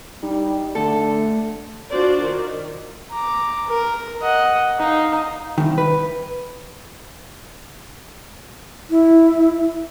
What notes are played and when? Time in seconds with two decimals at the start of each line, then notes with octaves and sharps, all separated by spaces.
0.23 G3 D#4
0.75 D3 A3 A4
1.90 D4 F4 F#4 C5 D5
2.21 D#3
3.11 A#5 D6
3.68 A#4
4.22 D#5 F#5
4.79 D#4 F5
5.58 C2 D#3
5.78 B4
8.90 E4